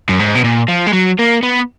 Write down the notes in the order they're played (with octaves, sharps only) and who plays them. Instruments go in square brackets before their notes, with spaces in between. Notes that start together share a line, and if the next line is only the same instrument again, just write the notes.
[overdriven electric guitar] F#2
G#2
B2
A#2
F3
G#3
F#3
A#3
B3